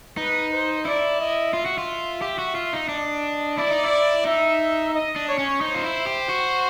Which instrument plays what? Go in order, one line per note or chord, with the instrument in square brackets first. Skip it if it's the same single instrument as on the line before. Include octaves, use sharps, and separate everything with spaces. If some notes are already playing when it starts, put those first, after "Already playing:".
[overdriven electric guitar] D#4 [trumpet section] B4
[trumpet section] C5
[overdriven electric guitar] E4 [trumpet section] D5
[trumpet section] D#5
[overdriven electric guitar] F4 [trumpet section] E5
[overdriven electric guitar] F#4
F4
G4
F#4
F4
D#4
[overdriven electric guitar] D4 [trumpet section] D#5
[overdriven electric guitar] E4 [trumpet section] D5
[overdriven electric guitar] D#4
E4
[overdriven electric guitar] D#4 [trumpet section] E5
[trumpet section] D#5
[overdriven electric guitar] D4
[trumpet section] C#5
[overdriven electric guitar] C#4
[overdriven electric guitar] D#4 [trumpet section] C5
[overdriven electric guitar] F4
E4
G4
F#4